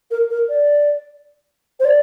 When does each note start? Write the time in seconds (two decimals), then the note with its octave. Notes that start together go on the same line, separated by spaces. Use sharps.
0.11 A#4
0.30 A#4
0.49 D5
1.80 C5
1.85 D5